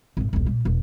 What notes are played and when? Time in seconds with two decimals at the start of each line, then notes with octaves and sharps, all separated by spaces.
0.17 G#1 A2
0.33 E1 C2
0.46 A#2
0.65 E1